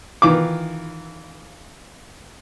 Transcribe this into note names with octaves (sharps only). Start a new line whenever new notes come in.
D#3 E3 F4 D6